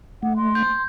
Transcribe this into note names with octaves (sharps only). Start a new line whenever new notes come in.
A3 F#5
C6
G6